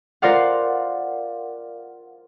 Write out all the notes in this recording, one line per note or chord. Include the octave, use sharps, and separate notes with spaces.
F4 A#4 C5 D5 F5 F#5